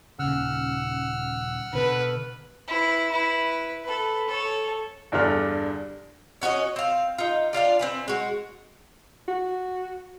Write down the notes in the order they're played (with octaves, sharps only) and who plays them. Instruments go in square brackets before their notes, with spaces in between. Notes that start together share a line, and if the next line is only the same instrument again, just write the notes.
[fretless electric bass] D#1 C#3 [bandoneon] F#5 E6 F6
[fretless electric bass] B2 D3 [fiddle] B4
[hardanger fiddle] E4 B4
E4 B4
A4 B4
A4 C#5
[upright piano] E2 G2 D3 D4 F6
[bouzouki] C#4 F#4 C#5 D#5
C4 F5
D#4 F4
D4 F4 D5 F5
C4 B4 G#5
G#3 F#4
[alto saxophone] F#4